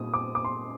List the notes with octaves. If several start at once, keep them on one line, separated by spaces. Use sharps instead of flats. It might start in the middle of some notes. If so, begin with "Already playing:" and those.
Already playing: A#2 G3 D#4 D#6
D6
D6
C6